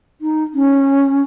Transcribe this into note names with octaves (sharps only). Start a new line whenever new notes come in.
D#4
C#4